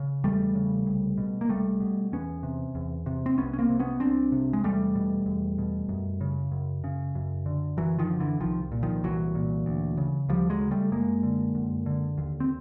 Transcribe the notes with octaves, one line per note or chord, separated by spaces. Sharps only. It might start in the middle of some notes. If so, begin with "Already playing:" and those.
Already playing: C#3
E2 G3 A3
C#3
C2
B2
A#3
C2 G3 A3
B2
E2 B3 C#4
C3
E2
C3
C4
C2 B3 C#4
C#4
A#3 C4
C3
B3 C#4
C2 C4 D4
C3
G#3
E2 G3 A3
B2
E2
B2
F#2
C#3
F#2
C#3
F#2
D3
F#2 E3 F#3
D#3 F3
D3
D3 E3
C2 D#3 F3
A#2
D#3 F3
C2 E3 F#3
A#2
D2
C#3
D2 F3 G3
F#3 G#3
C#3
G3 A3
F#2 G#3 A#3
D3
F#2
D3
D#2
C4